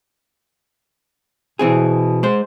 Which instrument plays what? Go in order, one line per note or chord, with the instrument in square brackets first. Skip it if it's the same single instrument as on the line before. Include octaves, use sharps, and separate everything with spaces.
[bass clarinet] B2 [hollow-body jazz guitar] E3 C4 G#4
[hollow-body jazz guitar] G#3 C5